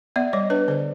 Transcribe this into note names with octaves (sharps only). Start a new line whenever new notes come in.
B3 D5 E5
G3 C#5 D#5
D4 B4 C#5
D3 C5 D5